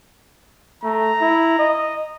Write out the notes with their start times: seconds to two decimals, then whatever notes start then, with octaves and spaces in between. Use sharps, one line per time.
0.84 A3 A#5
1.21 E4
1.59 D#5